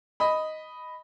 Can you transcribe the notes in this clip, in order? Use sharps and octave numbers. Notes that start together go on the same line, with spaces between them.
D#5 B5